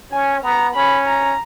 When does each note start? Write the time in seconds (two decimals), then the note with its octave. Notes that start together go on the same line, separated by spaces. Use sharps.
0.12 C#4 G#5
0.43 B3 A#5
0.75 C#4 B5
1.07 A#5